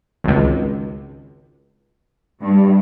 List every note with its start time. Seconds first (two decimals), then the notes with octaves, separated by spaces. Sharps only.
0.24 G#1 C#2
2.42 G2